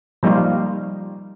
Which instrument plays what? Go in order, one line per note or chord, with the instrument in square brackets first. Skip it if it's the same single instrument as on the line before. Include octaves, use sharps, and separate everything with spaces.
[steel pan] F3 G3 A#3 D#4 F4